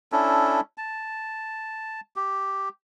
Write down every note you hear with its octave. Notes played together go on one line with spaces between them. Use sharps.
C#4 D4 E4 A4
A5
G4